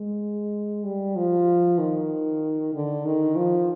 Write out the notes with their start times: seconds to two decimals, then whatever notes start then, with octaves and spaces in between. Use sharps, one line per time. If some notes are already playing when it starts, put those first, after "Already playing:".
Already playing: G#3
0.84 G3
1.16 F3
1.78 D#3
2.74 D3
3.05 D#3
3.36 F3